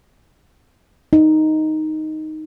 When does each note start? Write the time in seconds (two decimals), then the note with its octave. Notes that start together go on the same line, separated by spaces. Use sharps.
1.13 D#4